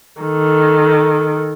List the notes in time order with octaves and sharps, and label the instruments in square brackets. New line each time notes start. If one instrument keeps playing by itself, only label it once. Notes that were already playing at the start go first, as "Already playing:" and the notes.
[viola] D#3 A4